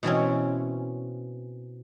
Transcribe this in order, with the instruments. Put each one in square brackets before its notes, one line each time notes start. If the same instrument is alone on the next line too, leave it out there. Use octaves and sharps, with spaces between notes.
[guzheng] B2 E3 C4 C#4